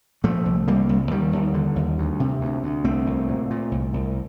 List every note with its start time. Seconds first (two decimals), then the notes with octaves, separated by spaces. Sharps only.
0.24 A#2 F3 A3
0.45 C2
0.68 C2 G3 A#3
0.89 C2
1.11 D#2 D#3 G3
1.33 D#2
1.54 D3
1.76 D#2
1.98 D2
2.20 C3
2.41 D2
2.63 D2
2.84 C2 A3 C4
3.06 C2
3.28 A#2
3.50 A#2
3.72 C2
3.94 C2